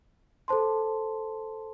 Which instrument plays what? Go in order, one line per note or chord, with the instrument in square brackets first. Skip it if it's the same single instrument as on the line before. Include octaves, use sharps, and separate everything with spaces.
[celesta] A4 C5 A5 C6